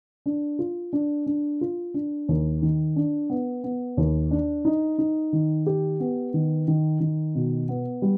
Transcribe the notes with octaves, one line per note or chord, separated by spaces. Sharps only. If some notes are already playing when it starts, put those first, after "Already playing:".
D4
F4
D4
D4
F4
D4
D#2
D#3
D4
B3
B3
D#2
D4
D#4
D#4
D#3
G4
B3
D#3
D#3
D#3
B2
B3
G3